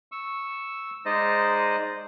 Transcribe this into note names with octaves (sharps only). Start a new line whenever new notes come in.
C#6 E6
G#3 D#4 C5 D5 D#5